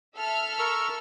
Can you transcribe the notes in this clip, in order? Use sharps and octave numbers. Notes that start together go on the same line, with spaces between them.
A4 E5 F6
A#4 C#6 E6